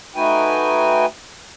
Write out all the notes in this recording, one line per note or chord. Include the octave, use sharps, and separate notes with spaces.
A3 D#4 F#4 B4 G5 G#5